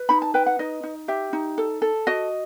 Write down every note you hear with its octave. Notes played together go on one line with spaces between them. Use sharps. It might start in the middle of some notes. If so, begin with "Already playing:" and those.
Already playing: B4
D#4 B5
A5
B4 G5
F#5
D#4 D#5
D#4
G4 E5
D#4
A4
A4
F#4 D#5